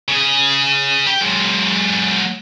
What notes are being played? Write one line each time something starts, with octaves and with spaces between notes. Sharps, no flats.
C#3 G#4
G4 G5
F#3 G#3